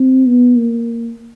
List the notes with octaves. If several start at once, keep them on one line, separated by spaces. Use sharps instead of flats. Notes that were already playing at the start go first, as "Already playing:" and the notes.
Already playing: C4
B3
A#3